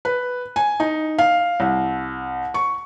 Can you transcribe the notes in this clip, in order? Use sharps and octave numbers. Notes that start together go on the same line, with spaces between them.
B4
G#5
D#4
F5
C2
C#6